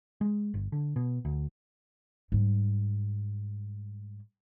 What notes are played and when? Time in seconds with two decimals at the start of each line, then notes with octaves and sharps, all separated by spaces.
0.21 G#3
0.54 G1
0.72 D3
0.96 B2
1.25 D2
2.32 G#2 G3